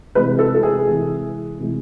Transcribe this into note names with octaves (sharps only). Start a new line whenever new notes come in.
C3 E3 G#3 B4
A4
A4
G#4
C3 E3 G#3
C3 E3 G#3